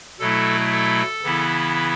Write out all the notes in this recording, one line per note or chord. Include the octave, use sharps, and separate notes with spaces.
B2 F#3 A3 E4 A4
A4
C#3 E3 B3 E4